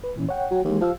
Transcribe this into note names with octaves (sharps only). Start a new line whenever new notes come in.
B4
A#2 E3 C#4
C#5 F#5 G5
F#3
D#2 E3 G#3
F3 G4 F5 E6